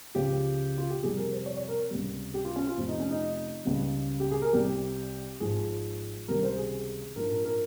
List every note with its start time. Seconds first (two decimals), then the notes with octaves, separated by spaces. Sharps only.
0.15 C#2 C#3 F3 G4
0.78 F4
0.90 G4
1.02 F2 C3 G3 G#4
1.17 A#4
1.32 C5
1.46 C#5
1.57 C#5
1.68 A#4
1.91 C#2 C3 G3
2.34 G4
2.45 F4
2.56 C#4
2.67 F4
2.77 F1 F2 C3 F3 C4
2.89 D#4
3.00 C#4
3.10 D#4
3.65 C#2 C#3 G3
4.20 G4
4.31 G#4
4.42 A#4
4.53 C2 C3 G3 G4
5.40 G#1 G#2 F3 G#4
6.28 C#2 C3 D#3 G3 A#4
6.43 C5
6.57 G#4
7.16 A#1 G#2 F3 A#4
7.31 A#4
7.45 A#4